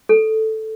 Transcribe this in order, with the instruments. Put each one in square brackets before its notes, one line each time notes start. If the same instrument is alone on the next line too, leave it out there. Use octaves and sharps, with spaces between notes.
[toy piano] A4